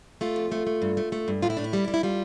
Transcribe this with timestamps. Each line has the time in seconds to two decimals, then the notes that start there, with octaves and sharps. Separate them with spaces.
0.21 A3 F4
0.36 F2
0.52 A3
0.67 A3
0.82 G2
0.97 A3
1.12 A3
1.28 G2
1.42 A2 F4
1.50 E4
1.57 A2 D4
1.64 E4
1.73 G3
1.84 G3 D4
1.94 E4
2.03 G3 F4